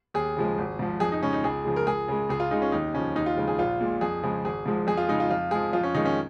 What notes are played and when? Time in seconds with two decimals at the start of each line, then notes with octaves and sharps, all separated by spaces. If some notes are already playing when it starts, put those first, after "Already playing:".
0.14 D#2 G#4
0.36 C#3 F3 G#3
0.58 G#1
0.79 G#2 F3
1.00 F2 G#4
1.12 D#4
1.22 C#3 G#3 C#4
1.33 D#4
1.44 C#2 G#4
1.65 C#3 F3 G#3
1.76 A#4
1.87 C#2 G#4
2.08 C#3 G#3
2.29 C#2 G#4
2.40 F4
2.51 C#3 G#3 D#4
2.62 C#4
2.72 D#2 D#4
2.94 C#3 F3 C#4
3.15 D#2 D#4
3.26 F4
3.37 C#3 F3 G#3
3.48 G#4
3.59 A#1 F4
3.80 A#2 G#3
4.01 F2 G#4
4.23 C#3 F3 G#3
4.44 G#1 G#4
4.66 G#2 F3 G#3
4.87 F2 G#4
4.97 F4
5.08 C#3 G#3 D#4
5.20 F4
5.30 F2 F4
5.51 F3 G#3 G#4
5.73 F2 F4
5.83 C#4
5.94 D#3 G#3 D#4
6.05 C#4